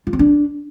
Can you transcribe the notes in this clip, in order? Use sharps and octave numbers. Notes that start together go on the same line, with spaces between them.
F4
C4
D4